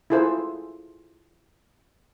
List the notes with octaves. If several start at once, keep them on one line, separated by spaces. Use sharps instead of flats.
E4 F4 G#4 A4 C5